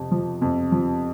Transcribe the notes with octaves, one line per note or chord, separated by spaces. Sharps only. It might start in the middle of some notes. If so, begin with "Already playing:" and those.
Already playing: F2 C3
F3
F2
F3